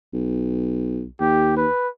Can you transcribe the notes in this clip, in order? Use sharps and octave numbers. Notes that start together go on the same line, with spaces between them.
B1
D#2 G4
B4